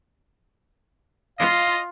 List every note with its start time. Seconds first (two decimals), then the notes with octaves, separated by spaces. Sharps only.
1.39 F4 D#5 F5